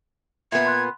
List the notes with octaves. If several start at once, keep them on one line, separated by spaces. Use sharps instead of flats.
A#2 B3 E5 G#6
B5 C6 F#6